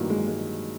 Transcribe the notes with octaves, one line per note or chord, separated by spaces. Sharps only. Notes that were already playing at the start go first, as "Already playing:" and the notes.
Already playing: A1 G2 D#3 F#3 A#3
G#3
G#3